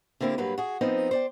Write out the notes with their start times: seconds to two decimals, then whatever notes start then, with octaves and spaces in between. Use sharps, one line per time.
0.20 D3 A#3 C4 E4 G4
0.38 G2 F#3 A#3 B4
0.58 F#4 G#4
0.81 F3 B3 C4 D#4
1.11 C5 D5 G5